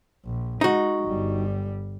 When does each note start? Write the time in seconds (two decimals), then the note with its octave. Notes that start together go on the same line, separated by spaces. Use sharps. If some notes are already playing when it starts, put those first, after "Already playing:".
0.25 A#1
0.61 G#3 D#4 F#4
1.05 G1 G3